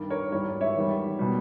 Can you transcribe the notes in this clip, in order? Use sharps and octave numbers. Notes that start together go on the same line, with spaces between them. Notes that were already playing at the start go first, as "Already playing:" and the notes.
Already playing: G2 D#3 G3
A#4 C#5
G#2 E3 G3 A#4 C#5
C#5 E5
E2 D#3 G3
B2 G3